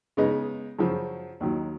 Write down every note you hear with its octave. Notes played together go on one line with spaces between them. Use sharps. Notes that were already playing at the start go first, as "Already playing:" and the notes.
C#3 G#3 B3 D#4
F#2 C#3 F3
D#2 D#3 F#3